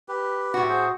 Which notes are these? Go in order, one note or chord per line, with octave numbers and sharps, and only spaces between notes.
G4 B4
A2 F#4
G#4 C5